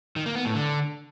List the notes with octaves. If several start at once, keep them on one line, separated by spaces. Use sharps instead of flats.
D#3
A#3
B3
A2
D3